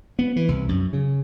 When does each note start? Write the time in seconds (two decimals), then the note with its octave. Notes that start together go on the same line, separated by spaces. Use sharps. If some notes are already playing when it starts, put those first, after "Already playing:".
0.19 B3
0.36 E3
0.48 C2
0.69 F#2
0.93 C#3